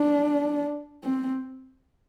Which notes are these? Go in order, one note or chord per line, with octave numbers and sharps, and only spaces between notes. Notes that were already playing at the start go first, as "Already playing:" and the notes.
Already playing: D4
C4